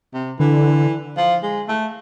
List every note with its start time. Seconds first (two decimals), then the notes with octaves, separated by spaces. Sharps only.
0.14 C3
0.40 D3 E3
1.17 F3
1.43 G#3
1.69 A3